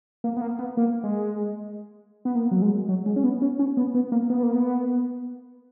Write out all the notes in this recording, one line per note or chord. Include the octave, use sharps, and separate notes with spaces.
A#3
B3
A#3
B3
A#3
G#3
B3
A#3
F#3
G#3
F#3
G#3
C#4
B3
C#4
C#4
B3
B3
A#3
B3
A#3
B3